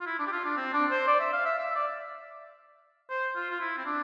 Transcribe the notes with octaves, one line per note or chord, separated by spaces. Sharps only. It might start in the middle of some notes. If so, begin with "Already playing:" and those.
F4
E4
D4
G4
F4
D4
C4
D4
C5
D5
E5
F5
E5
E5
D5
C5
F4
F4
E4
C4
D4